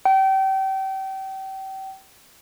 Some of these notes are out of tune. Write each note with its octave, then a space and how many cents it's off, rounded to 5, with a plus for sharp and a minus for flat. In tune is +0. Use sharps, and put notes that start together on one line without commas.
G5 -30